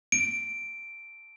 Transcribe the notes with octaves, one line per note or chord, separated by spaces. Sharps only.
D7